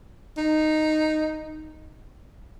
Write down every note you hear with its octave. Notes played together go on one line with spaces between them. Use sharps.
D#4